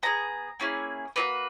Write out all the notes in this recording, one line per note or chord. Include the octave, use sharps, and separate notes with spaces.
B3 E4 G#4 A#5
A#3 C#4 E4 G#4
A#3 D#4 F#4 B4